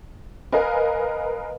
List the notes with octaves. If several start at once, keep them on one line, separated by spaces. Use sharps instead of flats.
A#4 B4 D#5 F5 G#5